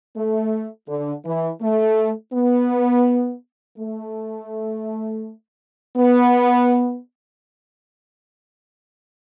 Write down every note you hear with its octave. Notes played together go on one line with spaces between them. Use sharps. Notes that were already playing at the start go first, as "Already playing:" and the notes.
A3
D3
E3
A3
B3
A3
B3